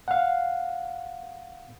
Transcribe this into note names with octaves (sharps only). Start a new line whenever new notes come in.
F5 F#5